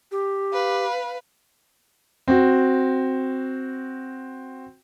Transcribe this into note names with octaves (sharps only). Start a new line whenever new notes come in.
G4
B4 F5
C4 F#4